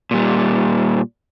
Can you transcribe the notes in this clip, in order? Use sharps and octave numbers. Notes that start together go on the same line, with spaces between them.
A#2 G3